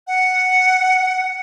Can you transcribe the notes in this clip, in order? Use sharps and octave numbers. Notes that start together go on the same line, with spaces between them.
F#5